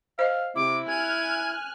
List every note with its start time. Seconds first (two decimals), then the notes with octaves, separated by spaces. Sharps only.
0.19 C5 D#5 F5
0.56 C3 E4 D6
0.88 G#5 F6 F#6 G#6